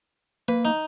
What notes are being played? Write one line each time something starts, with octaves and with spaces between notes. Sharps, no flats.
A#3 B4
D#4